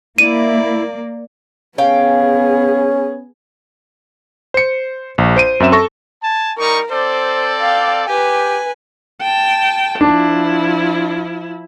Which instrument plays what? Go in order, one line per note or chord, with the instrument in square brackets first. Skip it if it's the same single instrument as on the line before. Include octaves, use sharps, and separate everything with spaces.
[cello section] A#3 [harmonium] E4 [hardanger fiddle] D5 [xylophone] D#7
[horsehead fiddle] B3 G#4 [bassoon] C#4 [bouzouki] F5 G5
[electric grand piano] C5 C#7
A#1
C5 D7 D#7
F#2 C4 E5 E7
A4 C#6 A#6
[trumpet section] G#5 A5
[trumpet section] G3 D#4 C#6 [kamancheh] A#4
[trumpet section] C4 A4 D5 [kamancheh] C5
[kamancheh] F5 G5
[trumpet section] G4 [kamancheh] B4 G#5
[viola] G5 A5
[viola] F3 E4 [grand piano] D4